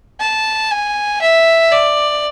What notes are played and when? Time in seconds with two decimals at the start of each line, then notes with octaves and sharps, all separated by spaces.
0.21 A5
0.71 G#5
1.21 E5
1.72 D5